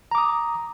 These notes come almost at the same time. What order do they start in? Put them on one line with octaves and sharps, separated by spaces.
A#5 D6 D#6